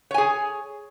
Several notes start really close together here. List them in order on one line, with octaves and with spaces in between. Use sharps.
C#5 G#5 G#4